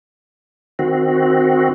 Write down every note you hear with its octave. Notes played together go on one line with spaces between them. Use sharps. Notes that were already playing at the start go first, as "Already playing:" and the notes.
D#3 C4 F#4